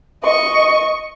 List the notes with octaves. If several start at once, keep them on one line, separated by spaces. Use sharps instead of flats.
D#5 C#6